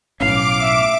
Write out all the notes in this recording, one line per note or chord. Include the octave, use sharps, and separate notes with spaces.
B1 A2 C#4 F5 D6 D7
E5